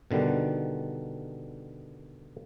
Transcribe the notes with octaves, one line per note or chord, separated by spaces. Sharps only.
B2 D3 D#3 G3